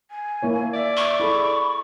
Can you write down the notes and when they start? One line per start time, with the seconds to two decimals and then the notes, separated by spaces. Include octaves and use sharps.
0.11 G#5
0.43 A#3 E4 C#5
0.74 D5 E5
0.97 C#6
1.20 E4 G#4 A4 B5